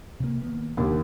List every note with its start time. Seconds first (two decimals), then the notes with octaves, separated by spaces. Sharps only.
0.20 C3 A#3
0.41 D#3 A#3 B3
0.77 D#2 A#2 C#3 D4